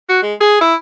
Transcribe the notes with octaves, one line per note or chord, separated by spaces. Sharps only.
F#4
G#3
G#4
E4